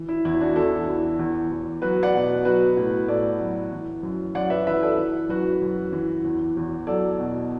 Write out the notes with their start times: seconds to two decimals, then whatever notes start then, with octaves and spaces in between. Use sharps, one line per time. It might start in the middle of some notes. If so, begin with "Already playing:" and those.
Already playing: E3
0.09 E4
0.25 E2 E4
0.41 D4 F#4
0.56 E2 E4 A4
0.88 E3
1.19 E2
1.51 E2
1.82 F#3 F#4 B4
2.03 D5 F#5
2.14 B2
2.45 F#3 F#4 B4
2.77 A2
3.08 A2 A4 D5
3.40 F#3
3.72 E3
4.03 F#2
4.35 F#2 D5 F#5
4.50 B4 E5
4.67 E3 B4 E5
4.83 A4 D5
4.97 E3
5.29 F#2 F#4 B4
5.62 F#2
5.92 E3
6.24 E2
6.57 E2
6.87 F#3 A4 D5
7.19 B2